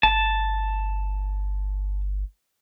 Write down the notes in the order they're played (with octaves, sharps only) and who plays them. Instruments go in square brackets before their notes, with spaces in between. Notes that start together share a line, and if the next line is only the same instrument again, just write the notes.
[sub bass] G1 [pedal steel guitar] A5